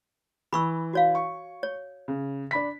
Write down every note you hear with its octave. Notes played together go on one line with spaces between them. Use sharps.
E3 B5 C#6 E6
F#4 C#5 F5
C#6
C#5
C#3
D4 B5 B6